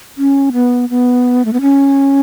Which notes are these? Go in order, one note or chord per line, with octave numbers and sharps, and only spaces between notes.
C#4
B3
B3
A3
B3
C#4